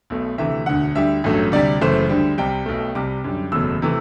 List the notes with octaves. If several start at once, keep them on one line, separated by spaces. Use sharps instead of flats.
B1 B2 A3
D2 C3 E3 A3 E5
E1 D2 D3 F#5
D2 D3 G3 E5
A1 G2 F#3 A3
D2 C3 G3 D5
F#1 F#2 E3 A3 C5
D2 D3 G3
C2 C3 G3 G5
B1 B2 A3
C2 C3 G3 D6
F#2 D3 G3
F#1 E2 B2 F#3 A3 E6
C3 E3 A3